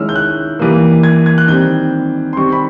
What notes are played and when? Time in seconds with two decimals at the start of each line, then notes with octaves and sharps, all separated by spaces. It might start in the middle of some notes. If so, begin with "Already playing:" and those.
Already playing: D#3 G#3 C#4 E4 E6 F6
0.09 G6
0.15 F#6
0.59 E3 G3 A#3
1.03 G#6
1.26 G#6
1.38 F#6
1.48 D#3 G3 C4 G6
2.33 C6
2.37 D#3 G3 C4 C#6
2.52 B5